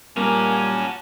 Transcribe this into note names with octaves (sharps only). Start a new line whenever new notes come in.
A#2 G3 A#3 C#4 F#4 G#5 A5